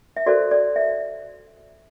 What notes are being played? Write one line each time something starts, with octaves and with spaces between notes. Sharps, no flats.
E5
F#4 A4 C5 D5
D5
E5